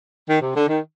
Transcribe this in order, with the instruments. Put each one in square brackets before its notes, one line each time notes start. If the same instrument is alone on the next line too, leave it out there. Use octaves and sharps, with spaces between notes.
[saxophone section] D#3
C3
D3
D#3